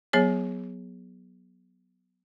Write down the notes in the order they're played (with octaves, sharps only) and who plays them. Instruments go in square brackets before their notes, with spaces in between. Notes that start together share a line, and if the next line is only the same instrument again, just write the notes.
[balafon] F#3 B3 G#4 C#5